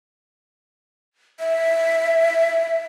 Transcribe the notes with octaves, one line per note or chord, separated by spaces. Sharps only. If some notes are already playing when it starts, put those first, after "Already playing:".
E5